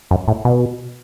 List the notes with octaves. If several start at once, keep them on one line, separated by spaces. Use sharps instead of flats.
F#2
A2
B2